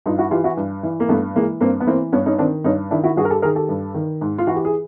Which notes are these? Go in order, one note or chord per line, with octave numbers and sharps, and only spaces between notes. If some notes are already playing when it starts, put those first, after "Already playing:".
G2 D#4 F4
E4 F#4
E3 F4 G4
E4 F#4
G2
E3
A#3
G2 A3 B3
E3 G#3 A#3
G2 A#3 C4
B3
E3 A#3 C4
G2 B3 C#4
C#4 D#4
D#3 C4 D4
G2 C#4 D#4
D#3 D4 E4
E4 F#4
G2 F#4 G#4
A#4
G4 A4
D#3 G#4 A#4
G4 A4
G2
D#3
G#2
F4
E3 F#4
G4
G#4